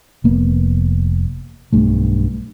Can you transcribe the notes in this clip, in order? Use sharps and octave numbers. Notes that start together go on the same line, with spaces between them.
F1 A#3 B3
B1 G2 A3